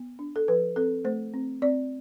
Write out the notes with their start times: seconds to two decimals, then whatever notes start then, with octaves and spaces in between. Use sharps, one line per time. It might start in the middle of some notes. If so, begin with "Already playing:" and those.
Already playing: B3
0.19 D4
0.36 A4
0.48 F3 B4
0.76 C4 A4
1.05 A3 C5
1.34 C4
1.62 C4 D5